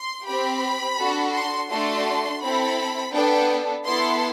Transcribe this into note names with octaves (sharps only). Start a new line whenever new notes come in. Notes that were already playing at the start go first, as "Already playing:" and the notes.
Already playing: C6
C4 G4 B5
D4 F#4 A4
C6
A3 D4 F#4 A4 C6
C4 E4 A4 B5
B3 D4 A4 G5
B3 E4 A4 C6